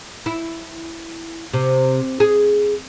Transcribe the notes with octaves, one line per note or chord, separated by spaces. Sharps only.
E4
C3
G#4